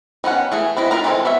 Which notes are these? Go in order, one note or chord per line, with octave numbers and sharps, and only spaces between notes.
D#3 B3 C#4 F#5
E3 A3 G#4
B3 C4 E4 D#5
D#4 F4 A#4 B4 A#5
D#3 E3 G#3 C4 A4
B3 C#5 E5